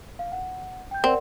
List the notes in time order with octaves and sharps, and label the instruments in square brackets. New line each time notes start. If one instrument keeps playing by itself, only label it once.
[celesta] F5
F#5
G5 G6
[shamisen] C4 [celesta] A#4 D5 F#5